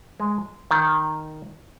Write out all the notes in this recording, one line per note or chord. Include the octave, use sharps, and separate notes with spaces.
G#3
D#3